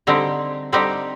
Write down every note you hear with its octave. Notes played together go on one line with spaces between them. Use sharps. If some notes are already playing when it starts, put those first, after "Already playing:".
D3 G3 C4 D#4 G4
D3 G3 C4 D#4 G4